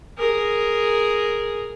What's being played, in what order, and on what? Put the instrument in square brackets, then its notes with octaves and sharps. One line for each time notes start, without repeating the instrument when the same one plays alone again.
[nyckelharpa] G#4 A#4